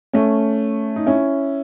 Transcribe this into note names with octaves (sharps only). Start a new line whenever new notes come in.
A3 C#4
D#4
C#4 E4